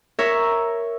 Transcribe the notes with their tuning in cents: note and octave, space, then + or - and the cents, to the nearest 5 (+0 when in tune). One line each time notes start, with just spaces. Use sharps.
A#4 +0 C#5 +0 E5 +0